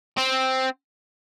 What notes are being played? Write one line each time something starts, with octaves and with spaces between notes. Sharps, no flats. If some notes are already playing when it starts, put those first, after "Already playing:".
C4